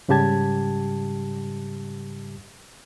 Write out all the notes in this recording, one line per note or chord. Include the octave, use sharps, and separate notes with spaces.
G#2 C#3 G3 G4 A5 G#6